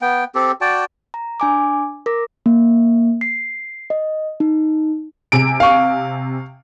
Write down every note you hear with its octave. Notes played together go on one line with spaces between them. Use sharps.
B3 G5
C4 G4 A4
F#4 D5 G5 A5
A#5
D4 G#5 D6
A#4 D6 A#6
A#3
C7
D#5
D#4
C3 G#5 D7
F5 C#6